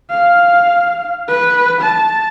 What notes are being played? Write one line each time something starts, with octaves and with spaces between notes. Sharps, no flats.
F5
B4
A5